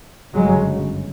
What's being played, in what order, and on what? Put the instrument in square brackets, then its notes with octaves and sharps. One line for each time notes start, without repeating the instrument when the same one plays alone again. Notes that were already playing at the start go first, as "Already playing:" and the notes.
[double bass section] G1 F#2 C#3 F#3 G#3